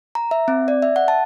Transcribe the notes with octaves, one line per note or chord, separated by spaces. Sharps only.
A#5
E5
C4
D5
E5
F#5
A5